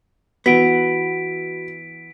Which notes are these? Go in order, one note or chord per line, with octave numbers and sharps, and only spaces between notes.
E3 B3 F#4 B6 D7